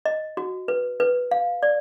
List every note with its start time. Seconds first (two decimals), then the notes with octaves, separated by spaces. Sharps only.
0.05 D#5
0.37 F#4
0.68 B4
1.00 B4
1.31 F5
1.63 D5